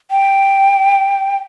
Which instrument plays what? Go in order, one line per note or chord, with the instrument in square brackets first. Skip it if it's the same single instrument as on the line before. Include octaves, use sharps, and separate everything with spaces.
[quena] G5